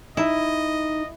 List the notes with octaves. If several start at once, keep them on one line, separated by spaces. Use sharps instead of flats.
D#4 E4 D#5